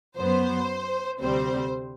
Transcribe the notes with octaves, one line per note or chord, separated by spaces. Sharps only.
F#2 F#3 B3 C5
D2 C3 G3 C4 C5